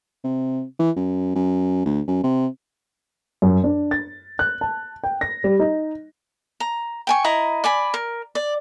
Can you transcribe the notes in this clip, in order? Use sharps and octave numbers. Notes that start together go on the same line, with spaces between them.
C3
E3
F#2
F#2
D2
F#2
C3
F#2
D4
A6
F#6
A5
G5
A#6
G3
D#4
A#5
G5 G#5 C#6
E4 D#5 A#5
D5 G#5 B5
A#4
D5